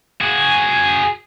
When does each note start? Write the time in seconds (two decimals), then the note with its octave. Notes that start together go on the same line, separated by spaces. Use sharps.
0.21 F#4 G#4